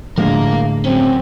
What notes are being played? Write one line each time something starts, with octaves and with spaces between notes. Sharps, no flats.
A2 D3 F3 G#3 A#3 A#4 F5
F#3 C4 C#4